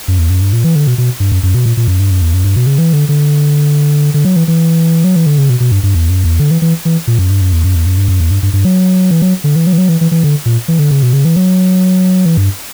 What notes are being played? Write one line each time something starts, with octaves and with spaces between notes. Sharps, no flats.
F#2
E2
F#2
G2
A#2
E3
D3
B2
B2
G2
F#2
F#2
B2
A#2
A#2
F#2
G2
F#2
E2
F#2
G2
B2
C#3
E3
D3
D3
D3
F#3
E3
E3
F#3
E3
D3
C#3
B2
B2
G2
G2
E2
F#2
E2
D3
E3
E3
E3
A#2
F#2
G2
F#2
E2
F#2
E2
F#2
G2
F#2
E2
G2
G2
G2
F#3
E3
F#3
D3
E3
F#3
E3
F#3
E3
E3
E3
D3
A#2
E3
D3
C#3
B2
C#3
E3
F#3
E3
G2